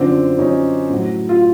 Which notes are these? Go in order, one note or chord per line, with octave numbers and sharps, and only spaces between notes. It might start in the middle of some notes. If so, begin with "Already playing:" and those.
Already playing: F#2 D3 F3 C4 D4
F#2 D3 F3 C#4 D#4
A2 F#3
F4